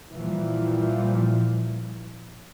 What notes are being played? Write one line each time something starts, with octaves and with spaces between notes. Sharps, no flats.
A#2 E3 F3 G3